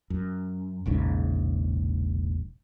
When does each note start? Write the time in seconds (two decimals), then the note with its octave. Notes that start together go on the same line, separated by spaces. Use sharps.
0.10 F#2
0.86 E1 A#1 G#2 C#3